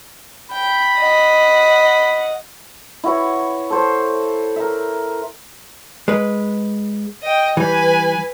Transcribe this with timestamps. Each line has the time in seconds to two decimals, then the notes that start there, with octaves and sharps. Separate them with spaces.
0.51 G5 B5
0.98 D#5 F#5
3.04 E4 F#4 B4 C#5
3.70 A4 C5 C#5
4.56 A#4 E5
6.08 G#3 B4
7.23 D#5 G5
7.57 E3 G3 B4 G#5